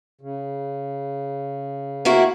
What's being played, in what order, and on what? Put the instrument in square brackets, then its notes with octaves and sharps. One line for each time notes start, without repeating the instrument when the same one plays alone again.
[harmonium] C#3
[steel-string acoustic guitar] A#3 E4 F#4